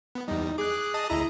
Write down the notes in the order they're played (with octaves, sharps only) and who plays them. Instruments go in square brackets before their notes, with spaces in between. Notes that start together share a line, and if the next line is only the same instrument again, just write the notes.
[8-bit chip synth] B3
[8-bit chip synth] E2 G3 [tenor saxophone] D#4
[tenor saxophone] G#4 [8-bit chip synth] D6 F#6
[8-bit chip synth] D#5 A5 D#6
[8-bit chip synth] D2 D#5 A#5 [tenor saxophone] E4